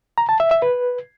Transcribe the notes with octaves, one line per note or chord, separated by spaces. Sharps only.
A#5
A5
E5
E5
B4